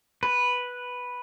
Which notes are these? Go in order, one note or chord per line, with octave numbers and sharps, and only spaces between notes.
B4